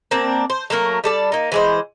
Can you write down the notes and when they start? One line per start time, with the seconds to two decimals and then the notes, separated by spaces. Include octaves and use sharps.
0.11 A#3 C4 D4
0.50 C5
0.70 F#3 A3 A#3 A#4
1.04 G3 A4 D5
1.32 A#3 D#4
1.52 E3 G#3 C5